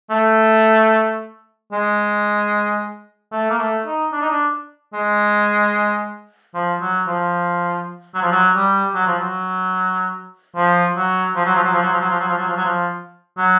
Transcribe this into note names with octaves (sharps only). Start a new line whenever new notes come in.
A3
G#3
A3
A#3
A3
D#4
D4
D#4
D4
G#3
F3
F#3
F3
F#3
F3
F#3
G3
F#3
F3
F#3
F3
F#3
F3
F#3
F3
F#3
F3
F#3
F3
F#3
F3
F#3
F3
F#3
F3
F#3
F3
F#3